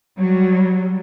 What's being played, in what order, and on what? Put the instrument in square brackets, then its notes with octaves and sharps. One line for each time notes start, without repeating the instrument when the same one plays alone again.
[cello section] F#3 G3